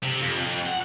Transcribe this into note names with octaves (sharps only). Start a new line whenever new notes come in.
C3
F2
F2
F#5